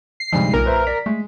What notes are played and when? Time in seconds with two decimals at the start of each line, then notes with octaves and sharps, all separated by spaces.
0.20 C7
0.33 D2 G2 C3 F3 G#3 D#4
0.54 B1 A#2 A#4
0.66 B4 C5 E5
0.87 D5 B6
1.06 G#3 A3